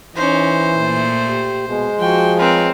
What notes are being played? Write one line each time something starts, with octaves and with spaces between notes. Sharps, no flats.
E3 C#4 D#4 C5
A#2 A3
G4
B2 G#3
F3 F#4 G5 C6
C4 A#4 B4 C#5